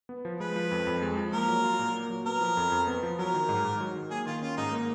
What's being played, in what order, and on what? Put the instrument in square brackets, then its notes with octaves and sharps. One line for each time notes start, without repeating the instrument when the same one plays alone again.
[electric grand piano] B3
F3
[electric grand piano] G#3 [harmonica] B4
[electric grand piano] F3
F2
F2
G#3
F3
[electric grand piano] A#3 [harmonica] A#4
[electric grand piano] F#3
F4
A#2
A#3
F#3
[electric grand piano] B3 [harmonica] A#4
[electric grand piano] F3
F2
F2
B3
F3
[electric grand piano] F#3 [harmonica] A#4
[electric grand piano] D#3
G#2
G#2
F#3
D#3
[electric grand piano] A#3 [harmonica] G#4
[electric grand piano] D#3 [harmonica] F4
[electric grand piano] C#4 [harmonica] F4
[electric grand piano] G#2 [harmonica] D#4
[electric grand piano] A#3